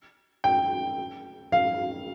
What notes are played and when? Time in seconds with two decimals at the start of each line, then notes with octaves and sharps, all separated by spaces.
0.44 G5
1.52 F5